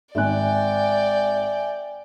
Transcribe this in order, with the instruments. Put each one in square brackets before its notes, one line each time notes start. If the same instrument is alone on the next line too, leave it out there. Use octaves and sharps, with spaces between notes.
[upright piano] G#1 G#2 F#6 [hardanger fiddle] D5 G5 [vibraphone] E5 G#5